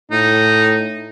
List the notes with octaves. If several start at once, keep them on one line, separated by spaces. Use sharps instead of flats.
A2 D#4